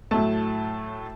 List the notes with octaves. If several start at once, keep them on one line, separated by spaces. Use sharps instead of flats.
A2 F#3 A3 A5